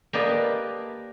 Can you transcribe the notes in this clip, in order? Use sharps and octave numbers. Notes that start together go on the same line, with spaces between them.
A#3 G4 B4 D5 D#5 A5